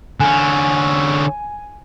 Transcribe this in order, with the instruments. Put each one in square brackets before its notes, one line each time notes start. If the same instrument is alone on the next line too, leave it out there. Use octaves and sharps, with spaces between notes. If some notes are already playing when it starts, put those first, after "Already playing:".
[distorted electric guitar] D3 C#4 [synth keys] G#5